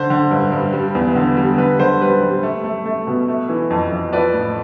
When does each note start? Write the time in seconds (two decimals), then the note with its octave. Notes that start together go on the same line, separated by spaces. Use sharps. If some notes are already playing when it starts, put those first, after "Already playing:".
Already playing: D3 C5
0.10 D3
0.31 G2
0.52 G2
0.73 G3
0.95 E2
1.15 D3
1.37 G3
1.58 D3 B4
1.79 D3 C5
2.01 G3 B4
2.21 G3
2.43 A3
2.64 A3
2.86 A3
3.07 B2
3.28 A3
3.49 E3
3.70 F2
3.92 F2
4.13 F3 B4 D5
4.34 A2